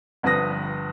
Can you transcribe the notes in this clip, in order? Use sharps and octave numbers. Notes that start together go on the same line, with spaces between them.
G1 G2 F3 B4 D#6 A#6